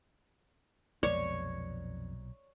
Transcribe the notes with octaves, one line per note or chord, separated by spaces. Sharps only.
B1 F2 A#2 G#3 B3 C#5 D5